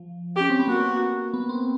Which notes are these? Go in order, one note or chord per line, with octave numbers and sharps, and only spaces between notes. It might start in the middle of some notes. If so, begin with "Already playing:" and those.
Already playing: F3
C#4 G4
C4
B3
A#3 F#4
B3
C4